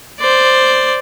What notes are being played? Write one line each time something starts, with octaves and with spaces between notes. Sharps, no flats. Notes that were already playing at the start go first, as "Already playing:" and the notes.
C5 D5